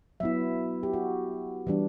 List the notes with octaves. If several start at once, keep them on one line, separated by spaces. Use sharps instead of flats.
F#3 B3 E4 E5
G4
F#4
E3 G3 D4